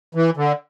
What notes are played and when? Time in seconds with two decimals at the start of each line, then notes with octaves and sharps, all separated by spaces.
0.15 E3
0.37 D3